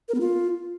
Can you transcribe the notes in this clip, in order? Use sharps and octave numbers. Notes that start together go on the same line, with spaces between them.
A#4
B3
F4